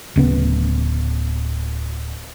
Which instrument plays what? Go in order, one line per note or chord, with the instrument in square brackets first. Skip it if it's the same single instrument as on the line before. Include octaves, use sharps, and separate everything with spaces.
[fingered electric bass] D1 C#3 B3